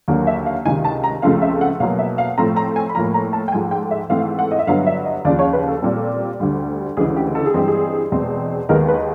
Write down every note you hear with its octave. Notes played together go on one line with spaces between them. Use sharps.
D#2 D3 F#3 A#3
E5
F5
C#2 C3 D#3 G#5
A5
A#5
C#2 C#3 F3 A3 C4 F5
E5
F#5
B2 F#3 A#3 F5
E5
F5
A2 F3 A3 C4 A#5
A#5
G#5
B5
A2 F3 A#3 A#5
A#5
A5
G5
G#2 F3 A3 G#5
G5
E5
G#2 E3 A3 C4 F5
F#5
D#5
E5
G2 D3 F#3 B3 F5
E5
D#5
D#2 C#3 F3 D5
C#5
B4
A4
A#2 G3 C4
D2 D3 G3
D2 C#3 E3 G#3 G#4
G4
A4
G#4
G2 E3 G#3 C4 G4
G#4
E2 B2 G#3 C4
D#2 D#3 G#3 B3 A#4
B4